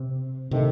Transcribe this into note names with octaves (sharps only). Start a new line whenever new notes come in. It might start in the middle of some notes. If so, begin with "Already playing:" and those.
Already playing: C3
C3 D#3 A3